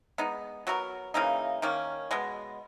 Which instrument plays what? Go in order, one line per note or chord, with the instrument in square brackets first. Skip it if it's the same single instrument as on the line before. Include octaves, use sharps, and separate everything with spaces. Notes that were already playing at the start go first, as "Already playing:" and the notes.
[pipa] G#3 B3 D#4
F#3 B3 F#4 A#4
C#3 E3 A#3 D#4
D#3 A#3 C#4
B2 G#3 B3